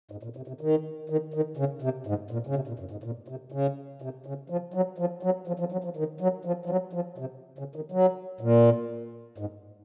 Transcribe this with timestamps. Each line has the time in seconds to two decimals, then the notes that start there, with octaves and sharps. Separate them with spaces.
0.11 G#2
0.23 A#2
0.36 C3
0.48 C3
0.61 D#3
1.10 D#3
1.34 D#3
1.57 C#3
1.82 C3
2.07 G#2
2.31 A#2
2.47 C#3
2.56 C3
2.68 A#2
2.79 F#2
2.91 G#2
3.04 A#2
3.28 C3
3.52 C#3
4.02 C3
4.26 C#3
4.50 F3
4.74 F#3
4.98 F3
5.23 F#3
5.48 F3
5.60 F3
5.72 F#3
5.84 F3
5.97 D#3
6.21 F#3
6.45 F3
6.66 F3
6.70 F#3
6.93 F3
7.18 C3
7.59 C#3
7.76 D#3
7.92 F#3
8.41 A#2
9.38 G#2